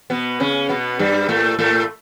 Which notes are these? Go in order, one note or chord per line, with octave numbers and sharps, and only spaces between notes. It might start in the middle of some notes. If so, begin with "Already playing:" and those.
B2 B3
C#3 C#4
B2 B3
G2 G3
A2 A3
A2 A3